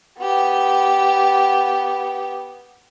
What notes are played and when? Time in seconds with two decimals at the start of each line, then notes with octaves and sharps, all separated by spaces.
0.19 B3 G4